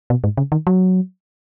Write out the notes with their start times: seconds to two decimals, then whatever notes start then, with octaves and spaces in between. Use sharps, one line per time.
0.10 B2
0.24 G#2
0.37 C#3
0.52 D#3
0.67 F#3